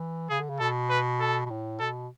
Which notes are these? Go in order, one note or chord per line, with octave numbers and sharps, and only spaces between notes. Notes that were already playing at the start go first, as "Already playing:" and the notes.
Already playing: E3
C#3 G#4
D3
C#3
B2 A4
B4
A4
B2
A2
B2 A4